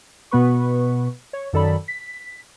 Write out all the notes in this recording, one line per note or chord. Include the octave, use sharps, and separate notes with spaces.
B2 B3 B4 C#6
C#5
F#2 D#3 A4 D5 B5
B6